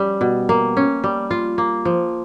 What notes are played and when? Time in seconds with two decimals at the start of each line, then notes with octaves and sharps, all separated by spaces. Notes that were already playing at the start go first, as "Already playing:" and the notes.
Already playing: G3 C#4
0.21 B2
0.49 A#3
0.77 C#4
1.04 G3
1.31 F4
1.58 A#3
1.85 F3